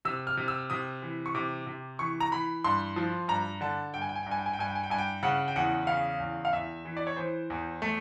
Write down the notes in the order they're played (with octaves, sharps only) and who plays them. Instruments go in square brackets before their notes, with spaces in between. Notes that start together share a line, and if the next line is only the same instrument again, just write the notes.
[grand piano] C3 E6
F6
C3
E6
C3 D#6
E3
C#6
C3 D6
C3
E3 C#6
A#5
E3 B5
G2 C6
F3
G2 A#5
D3 A5
G2 G5
G#5
G5
G#5
G5
G2
G#5
G5
G#5
G5
G2 G#5
G5
G#5
G5
G2 G#5
G5
C#3 F#5
G5
E2 F#5
C#3 F5
E2
F5
E2 E5
E3
D5
C#5
E3 C5
E2
A3